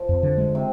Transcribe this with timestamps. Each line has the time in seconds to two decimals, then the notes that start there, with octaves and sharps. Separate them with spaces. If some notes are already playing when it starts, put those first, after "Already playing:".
Already playing: F3
0.09 F2
0.23 D3
0.37 G#3
0.55 C3